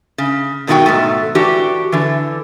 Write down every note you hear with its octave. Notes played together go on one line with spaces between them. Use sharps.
C#3
G2 B2 D#3 G3 F#4 G5
G#2 B2 A3
E3 D4 F#4 G4
D3 E3